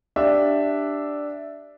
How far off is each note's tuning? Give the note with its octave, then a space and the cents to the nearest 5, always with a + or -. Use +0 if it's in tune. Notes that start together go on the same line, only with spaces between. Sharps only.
D4 +0 G4 +0 E5 +0